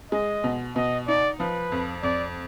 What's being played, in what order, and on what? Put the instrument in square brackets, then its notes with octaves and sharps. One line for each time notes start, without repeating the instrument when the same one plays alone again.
[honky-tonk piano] G#3 [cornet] D#5
[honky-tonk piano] B2
[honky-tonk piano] B2 [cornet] D#5
[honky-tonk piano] D#4 [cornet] D5
[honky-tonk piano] F3 [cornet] B4
[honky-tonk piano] F2
[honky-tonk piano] F2 [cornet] D5